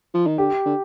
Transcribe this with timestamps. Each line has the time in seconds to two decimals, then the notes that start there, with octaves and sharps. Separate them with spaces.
0.14 F3
0.27 D#3
0.38 D3 G4
0.65 D3